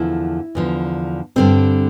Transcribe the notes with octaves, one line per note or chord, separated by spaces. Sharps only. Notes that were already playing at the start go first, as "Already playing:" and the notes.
Already playing: E2 D3 F3 E4
E2 D3 F3
G2 D3 G3 C4